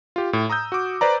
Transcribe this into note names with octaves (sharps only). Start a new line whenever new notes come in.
F4 G4
A2
A#5 D#6 E6 G6
F#4 D6
B4 C5 D5 A#5